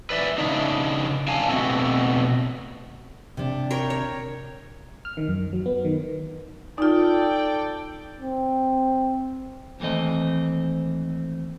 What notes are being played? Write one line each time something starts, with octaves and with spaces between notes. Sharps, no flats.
B4 D5 E5
C#3 D4 D#4
G2 F5 G#5 A5
B2 A3 C4 F#4
C3 D4
A#4 C#5 G5
C#5
F6
D#3
F#2
F#3
B3
D#3
D#4 F4 A4 D5 G5
C4
D#2 E3 A3 C4 D#5